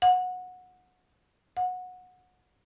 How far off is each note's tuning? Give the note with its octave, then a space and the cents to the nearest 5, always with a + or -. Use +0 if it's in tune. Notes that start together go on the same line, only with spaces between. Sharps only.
F#5 -20
F#5 -20